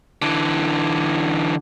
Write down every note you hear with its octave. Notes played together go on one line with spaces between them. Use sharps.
D3 E3